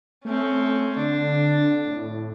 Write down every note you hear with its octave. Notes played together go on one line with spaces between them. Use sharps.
A3 C4 C#4
D3 D4
A2